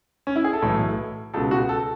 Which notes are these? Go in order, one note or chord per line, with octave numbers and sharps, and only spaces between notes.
C#4
E4
G#4
A4
B1 A2 E3
C#2 B2 A4
F#4
A4